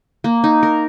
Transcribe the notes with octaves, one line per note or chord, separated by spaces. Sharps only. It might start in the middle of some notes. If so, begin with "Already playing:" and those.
A#3
D#4
A#4